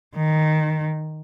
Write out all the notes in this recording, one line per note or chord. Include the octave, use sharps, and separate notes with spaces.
D#3